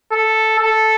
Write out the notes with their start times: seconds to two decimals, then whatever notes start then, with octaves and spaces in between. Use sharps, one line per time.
0.12 A4
0.59 A4